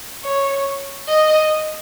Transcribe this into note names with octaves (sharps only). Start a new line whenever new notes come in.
C#5
D#5